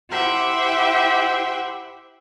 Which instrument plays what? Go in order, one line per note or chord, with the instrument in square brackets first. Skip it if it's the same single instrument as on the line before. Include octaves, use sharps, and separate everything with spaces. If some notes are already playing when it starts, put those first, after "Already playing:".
[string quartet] E4 G4 C5 E5 F#5 G5